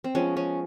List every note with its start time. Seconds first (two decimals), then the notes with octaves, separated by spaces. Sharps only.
0.04 C4
0.15 F3 G#3 B3 C#4
0.37 C#4